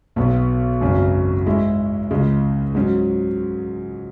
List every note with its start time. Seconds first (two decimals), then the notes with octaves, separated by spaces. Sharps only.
0.16 B1 B2 B3
0.81 G#1 F#2 C#3 F#3 C#4
1.46 G#2 G#3 E4
2.11 C#2 C#3 G#3
2.75 G#2 F#3 C#4